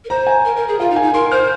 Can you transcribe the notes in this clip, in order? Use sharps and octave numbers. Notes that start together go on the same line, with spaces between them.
A#4
C5 A#5
G#5
A#4
A#4
G#4
F4 F5
D#4
G#5
D#4
A#4 C6
C5 F6